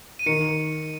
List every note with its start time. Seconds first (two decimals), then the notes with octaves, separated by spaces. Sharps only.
0.19 D#7
0.26 D#3 C#7